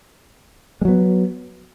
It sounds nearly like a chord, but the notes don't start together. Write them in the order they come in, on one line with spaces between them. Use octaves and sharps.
G#3 F#3 B3